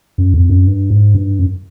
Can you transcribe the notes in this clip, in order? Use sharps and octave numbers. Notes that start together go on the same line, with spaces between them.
F#2
F2
F#2
G2
G#2
G2
F#2